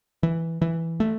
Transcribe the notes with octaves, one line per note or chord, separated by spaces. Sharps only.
E3
E3
A3